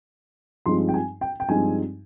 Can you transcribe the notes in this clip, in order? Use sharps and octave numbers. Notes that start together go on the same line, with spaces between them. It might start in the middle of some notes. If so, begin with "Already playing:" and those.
G2 F3 G#3 C4 D#4 C6
G5
G#5
G5
G5
G2 F3 G#3 C4 D#4 G#5